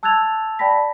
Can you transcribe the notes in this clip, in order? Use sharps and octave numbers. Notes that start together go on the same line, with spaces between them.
A5 E6 F#6 G#6 A6 F7
D5 G5 A5 B5 A#6 B6